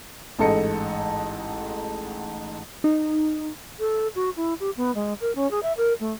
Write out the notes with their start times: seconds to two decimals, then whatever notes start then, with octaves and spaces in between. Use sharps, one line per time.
0.39 A1 G#2 A4 D#5 C#7
2.84 D#4
3.79 A4
4.15 F#4
4.36 E4
4.60 G4
4.77 B3
4.95 G#3
5.21 A#4
5.35 C#4
5.51 G#4
5.63 E5
5.77 A#4
6.00 A3